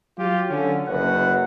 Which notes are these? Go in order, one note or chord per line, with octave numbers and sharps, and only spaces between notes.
F#3 F4 G4
D3 C#4
F#1 F#2 B4 F#5